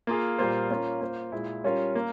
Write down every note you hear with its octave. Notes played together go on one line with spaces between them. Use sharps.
A#3 F4 G#4
A#2 G3 A#3 F4 C5
A#3 C#4 F4
A#3 F4 C5
A#2 G#3 E4
G3 C#4 F4 A#4 C#5
A#3